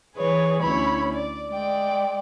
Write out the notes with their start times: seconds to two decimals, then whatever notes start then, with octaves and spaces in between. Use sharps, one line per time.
0.16 E3 G#4 B4 C#5
0.62 D2 C#4 E4 C#5 B5
1.13 D5
1.49 G#3 D5 G5